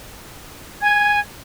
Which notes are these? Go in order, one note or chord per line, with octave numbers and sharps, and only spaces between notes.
G#5 G#6